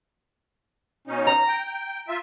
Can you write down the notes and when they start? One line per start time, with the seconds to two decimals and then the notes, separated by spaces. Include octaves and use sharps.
1.07 B2 C#4 D#4
1.27 A#5
1.48 G5
2.08 F4 E5